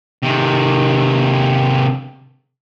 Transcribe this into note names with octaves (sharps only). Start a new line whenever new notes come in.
C3 D#3